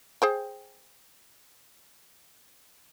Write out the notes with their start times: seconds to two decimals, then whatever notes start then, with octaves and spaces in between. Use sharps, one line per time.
0.22 G#4 C5 G5